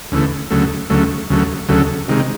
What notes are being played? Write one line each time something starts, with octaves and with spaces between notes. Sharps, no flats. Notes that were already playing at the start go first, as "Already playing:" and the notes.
D2 C#3 E3 A3
D2 C#3 F#3 A3
D2 C#3 F#3 A3
D2 C#3 F#3 A3
D2 C#3 F#3 A3
C3 D#3 G#3